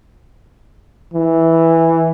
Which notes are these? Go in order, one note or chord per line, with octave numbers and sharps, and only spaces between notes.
E3